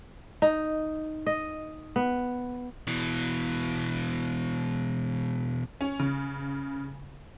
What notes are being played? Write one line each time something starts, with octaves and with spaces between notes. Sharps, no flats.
D#4
D#5
B3
B2 E3
C#4
C#3